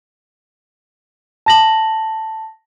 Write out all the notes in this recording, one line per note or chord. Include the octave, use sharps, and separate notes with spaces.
A5 A#6 F#7